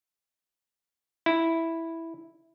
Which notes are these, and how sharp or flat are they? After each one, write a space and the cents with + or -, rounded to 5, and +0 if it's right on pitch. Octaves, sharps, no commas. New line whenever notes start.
E4 -5